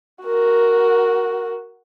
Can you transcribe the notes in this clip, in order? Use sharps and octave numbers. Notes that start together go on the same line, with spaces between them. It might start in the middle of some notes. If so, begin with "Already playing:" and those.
F#4 A#4